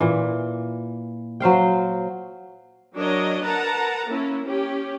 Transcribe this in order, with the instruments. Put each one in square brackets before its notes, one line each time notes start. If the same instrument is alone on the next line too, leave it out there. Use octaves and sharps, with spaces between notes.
[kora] A#2 E3
F#3 C5 F5 G5
[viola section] F#3 D4 A#4 C#5 D#5
A#4 B4 F#5 A5 A#5
A#3 C#4 E4
C#4 G4